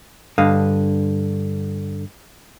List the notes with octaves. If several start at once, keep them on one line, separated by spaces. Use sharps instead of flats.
G2 D3 D#5 F5